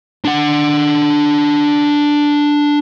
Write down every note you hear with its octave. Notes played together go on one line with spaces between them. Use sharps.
D4 F#5